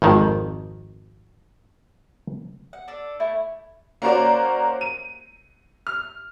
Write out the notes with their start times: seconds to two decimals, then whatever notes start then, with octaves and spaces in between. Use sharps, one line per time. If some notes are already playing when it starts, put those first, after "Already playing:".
0.02 G#1 F2 D#3
2.73 F#5
2.88 D4 A4
3.20 A3 E4 G#5
4.02 A#3 C#4 F#4 A#4 C5 D5
4.81 D#7
5.87 F6